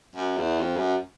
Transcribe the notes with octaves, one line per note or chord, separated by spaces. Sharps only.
F#2
E2
F2
F#2